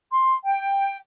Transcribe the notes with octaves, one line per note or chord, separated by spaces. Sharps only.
C6
G5